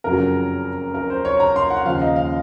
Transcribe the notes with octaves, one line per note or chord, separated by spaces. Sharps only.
F#1 F2 C#3 F#3 A#4
A#4
C5
C#5
A#5
C6
F#5
D#2 C#3 F3 F5
D#5
F5